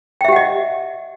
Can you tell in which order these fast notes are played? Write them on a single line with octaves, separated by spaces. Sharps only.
G5 E5 G4 F#5 D#5